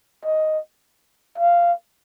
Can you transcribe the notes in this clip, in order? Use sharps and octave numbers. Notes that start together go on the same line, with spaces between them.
D#5
F5